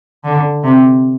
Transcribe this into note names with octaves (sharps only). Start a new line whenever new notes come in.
D3
C3